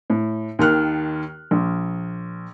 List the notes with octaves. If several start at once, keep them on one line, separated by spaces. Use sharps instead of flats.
A2
D#2 D#3 F6 F#6
A#1